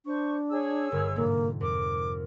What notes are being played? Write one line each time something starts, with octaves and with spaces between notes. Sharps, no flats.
D4 C5 C#6
G#4 C#5 E6
G1 G2 A#4
F1 G#2 A#3
F2 A#4 D6